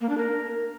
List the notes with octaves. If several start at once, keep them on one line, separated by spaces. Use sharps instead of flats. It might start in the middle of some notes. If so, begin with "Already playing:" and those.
A#3
D4
A#4